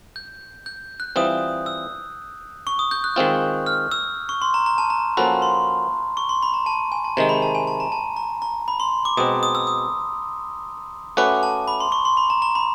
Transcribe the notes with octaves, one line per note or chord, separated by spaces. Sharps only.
G6
G6
F#6
E3 G3 C4 F4 D#6
E6
C#6
D#6
G6
F#6
D#3 G#3 C4 F4
F6
E6
C#6
C6
A#5
A#5
A5
A#5
F3 A#3 C#4 F#4 A4 B5
C6
C#6
C6
B5
A#5
A5
G#5
A5
C3 D#3 G#3 A#5
B5
A5
G#5
A5
A#5
A5
A#5
A#5
B5
C6
D6
B2 G#3 C4 D#6
D#6
E6
D#6
A3 C#4 F#4 B4 D6
A5
B5
C6
C#6
C6
B5
A#5
A#5
B5